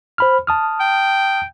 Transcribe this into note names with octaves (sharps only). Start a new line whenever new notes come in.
C5 B5 F6
A5 D#6 F6
G5